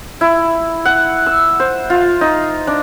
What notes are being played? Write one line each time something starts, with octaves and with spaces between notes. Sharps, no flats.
E4
F#5
E6
C5
F4
D#4
D4